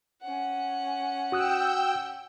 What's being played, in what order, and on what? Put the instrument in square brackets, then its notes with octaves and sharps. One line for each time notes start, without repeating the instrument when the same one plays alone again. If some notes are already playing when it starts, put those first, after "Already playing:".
[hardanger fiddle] C#4 F#5
[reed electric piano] F#4 D#6 F#6 [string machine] G5 E6